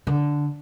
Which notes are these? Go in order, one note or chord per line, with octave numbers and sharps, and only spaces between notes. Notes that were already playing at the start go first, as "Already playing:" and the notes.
D3